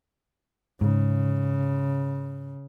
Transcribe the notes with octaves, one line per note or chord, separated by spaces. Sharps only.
G#2 C#3